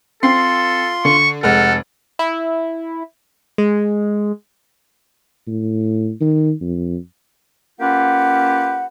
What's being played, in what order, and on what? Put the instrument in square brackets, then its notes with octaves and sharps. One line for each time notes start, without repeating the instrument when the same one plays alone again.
[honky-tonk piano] C4 C7 [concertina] F4 C6 [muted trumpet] A4
[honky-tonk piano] D3 [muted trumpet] C#6
[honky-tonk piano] F1 G#3 [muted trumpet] A4 [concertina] F#5 F6
[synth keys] E4
G#3
[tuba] A2
D#3
F2
[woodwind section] A#3 C#4 F4 G4 B4 F#5